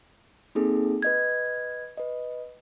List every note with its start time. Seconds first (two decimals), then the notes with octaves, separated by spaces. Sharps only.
0.55 A#3 C4 D#4 G#4 A4
1.02 B4 D#5 G#6
1.97 B4 D#5